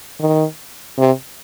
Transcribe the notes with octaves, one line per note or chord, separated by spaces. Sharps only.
D#3
C3